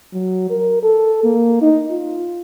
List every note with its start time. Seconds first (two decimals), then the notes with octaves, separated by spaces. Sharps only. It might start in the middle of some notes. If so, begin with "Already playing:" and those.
0.14 F#3
0.50 A#4
0.83 A4
1.24 A#3
1.61 D#4
1.91 F4